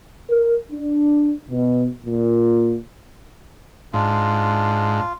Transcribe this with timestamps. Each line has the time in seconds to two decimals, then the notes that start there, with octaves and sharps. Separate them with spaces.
0.30 A#4
0.72 D4
1.51 B2
2.05 A#2
3.93 G#2 D4 F4